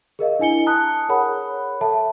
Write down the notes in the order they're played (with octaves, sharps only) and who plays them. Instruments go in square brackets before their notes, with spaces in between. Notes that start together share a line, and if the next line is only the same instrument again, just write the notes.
[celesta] G#4 A#4 D#5 F5
D4 E4 G#5 C#7 G7
A5 A#5 D#6 F#6
G#4 A#4 C#5 F#5 B5
A4 E5 A5